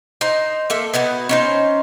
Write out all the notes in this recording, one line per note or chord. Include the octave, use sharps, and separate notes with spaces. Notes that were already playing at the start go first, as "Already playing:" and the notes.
D#4 C5
A#3 A4 E5
B3 D#4 E4 F#4
C#4 D#4 C5